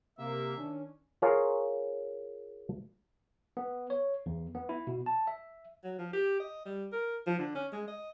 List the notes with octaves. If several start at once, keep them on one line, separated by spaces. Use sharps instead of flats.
C3 A#3 E5
D#3 C#4 D4
F4 G#4 A#4 C#5
B3
C#5
E2
B3
E4
B2
A5
E5
F#3
F3
G4
D#5
G3
A#4
F3
D3
C#4
G#3
D#5